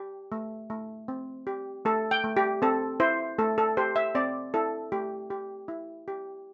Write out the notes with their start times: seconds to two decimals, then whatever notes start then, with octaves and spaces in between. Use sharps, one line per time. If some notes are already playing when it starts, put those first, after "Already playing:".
Already playing: G4
0.32 A3
0.70 A3
1.08 C4
1.47 G4
1.85 A3 A4
2.11 G5
2.24 A3
2.37 G4
2.62 C4 A4
3.00 E4 C5
3.38 A3 A4
3.58 A4
3.77 G4 C5
3.96 E5
4.15 C4 D5
4.54 E4 A4
4.92 A3 G4
5.30 G4
5.68 E4
6.08 G4